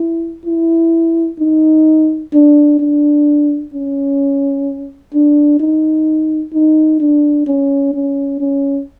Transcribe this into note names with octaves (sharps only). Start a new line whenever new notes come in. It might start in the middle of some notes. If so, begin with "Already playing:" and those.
Already playing: E4
E4
D#4
D4
D4
C#4
D4
D#4
D#4
D4
C#4
C#4
C#4